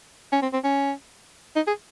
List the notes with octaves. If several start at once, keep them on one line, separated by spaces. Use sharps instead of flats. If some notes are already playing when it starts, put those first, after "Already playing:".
C#4
C4
C4
C#4
D#4
G#4